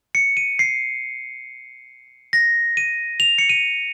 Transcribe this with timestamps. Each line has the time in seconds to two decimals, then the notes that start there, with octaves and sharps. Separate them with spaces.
0.15 C#7
0.37 D#7
0.59 C7
2.33 A#6
2.77 D#7
3.20 F7
3.38 C#7
3.49 D#7